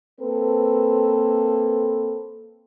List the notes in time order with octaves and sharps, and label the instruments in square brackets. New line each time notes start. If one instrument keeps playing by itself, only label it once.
[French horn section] A#3 C4 A4 B4